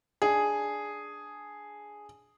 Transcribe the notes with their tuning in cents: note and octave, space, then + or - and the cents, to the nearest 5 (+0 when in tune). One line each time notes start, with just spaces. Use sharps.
D4 +0 G#4 +0